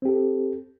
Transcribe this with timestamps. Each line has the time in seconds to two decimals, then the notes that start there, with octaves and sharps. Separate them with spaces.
0.02 C4
0.05 G4
0.09 A4